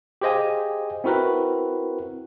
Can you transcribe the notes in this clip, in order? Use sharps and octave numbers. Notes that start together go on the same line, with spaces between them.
G4 G#4 C5 D#5 F5 G#5
C4 E4 F#4 A#4 B4